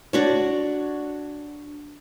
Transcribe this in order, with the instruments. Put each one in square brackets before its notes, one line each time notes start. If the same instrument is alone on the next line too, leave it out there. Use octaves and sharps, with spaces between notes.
[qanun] D4 F#4 C#5